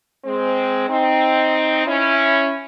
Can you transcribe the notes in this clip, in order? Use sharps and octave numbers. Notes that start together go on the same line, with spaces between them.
G#3 C4
C4 D#4
C#4 E4